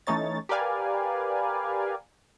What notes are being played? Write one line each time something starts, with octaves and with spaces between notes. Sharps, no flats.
E3 A3 C#4 D#4 C#5 A6
G4 A#4 B4 D5 F5 G#5